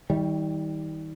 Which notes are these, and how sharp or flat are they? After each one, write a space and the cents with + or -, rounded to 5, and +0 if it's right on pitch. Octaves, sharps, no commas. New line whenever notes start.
D#3 +35 G3 -5